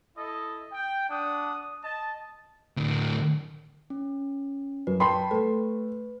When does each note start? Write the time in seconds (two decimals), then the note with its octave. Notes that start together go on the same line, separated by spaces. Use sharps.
0.17 E4 A4 D#5
0.72 G5
1.09 D4 F#5 D#6
1.83 D#5 A5
2.77 D2 A2
3.90 C#4
4.87 F#2 B4
5.00 G5 A5 B5 C6
5.31 A3 B4